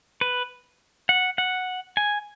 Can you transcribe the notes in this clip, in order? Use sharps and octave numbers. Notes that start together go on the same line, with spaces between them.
B4
F#5
F#5
G#5